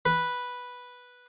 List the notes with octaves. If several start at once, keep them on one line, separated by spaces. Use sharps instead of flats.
B4